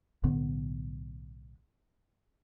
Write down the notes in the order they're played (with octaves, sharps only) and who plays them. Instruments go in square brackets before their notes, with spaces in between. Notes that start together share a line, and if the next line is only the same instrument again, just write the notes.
[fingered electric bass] B1 A2 D3 B3